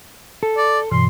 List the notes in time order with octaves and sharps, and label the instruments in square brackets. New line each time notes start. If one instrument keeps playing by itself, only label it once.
[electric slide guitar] A4
[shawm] D5
[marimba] G2 B2 E3 [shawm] C6